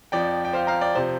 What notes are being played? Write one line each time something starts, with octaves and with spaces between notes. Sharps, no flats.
F2 F3 D5 G5
G5
C5 F5
F5 A#5
D5 G5
C3 F3 C5